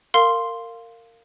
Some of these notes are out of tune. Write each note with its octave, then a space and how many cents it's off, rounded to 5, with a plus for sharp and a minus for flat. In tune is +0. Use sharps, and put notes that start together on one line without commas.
A#4 -25 F5 +0 C6 +0